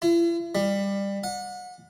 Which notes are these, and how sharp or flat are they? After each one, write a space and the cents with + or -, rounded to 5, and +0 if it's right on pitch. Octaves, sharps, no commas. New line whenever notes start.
E4 +45
G3 +20
F#5 -35